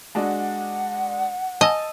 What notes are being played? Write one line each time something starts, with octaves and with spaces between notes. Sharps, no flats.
G#3 D4 F#4 F#5
D#5 G#5 A5 E6